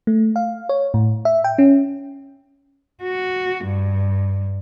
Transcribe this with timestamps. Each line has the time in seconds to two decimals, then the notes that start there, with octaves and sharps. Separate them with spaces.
0.07 A3
0.36 F5
0.69 C#5
0.94 A2
1.25 E5
1.44 G5
1.58 C#4
3.03 F#4
3.64 G2